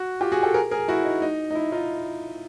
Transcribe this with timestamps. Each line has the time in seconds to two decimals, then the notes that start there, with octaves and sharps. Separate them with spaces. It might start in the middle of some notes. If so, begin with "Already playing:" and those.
Already playing: F#4
0.21 F4 G4
0.32 F#4 G#4
0.43 G4 A4
0.54 G#4 A#4
0.71 G#4 A#4
0.88 E4 F#4
1.05 D#4
1.22 D#4
1.51 D#4
1.55 E4
1.72 D#4 F4